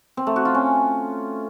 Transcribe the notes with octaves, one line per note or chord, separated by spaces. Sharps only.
C4
A3
F#4
F4
C#4